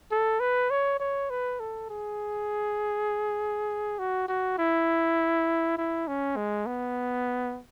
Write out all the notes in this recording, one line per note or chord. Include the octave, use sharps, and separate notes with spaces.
A4
B4
C#5
C#5
B4
A4
G#4
F#4
F#4
E4
E4
C#4
G#3
B3